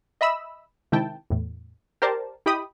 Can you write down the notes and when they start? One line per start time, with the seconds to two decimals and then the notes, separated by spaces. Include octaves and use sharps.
0.21 D#5 E5 B5 E6
0.92 C3 D#3 G#3 E4 G5 A5
1.30 E2 A2
2.02 G4 A#4 C5 D5 A5
2.46 E4 G4 D#5 G5 B5 D#6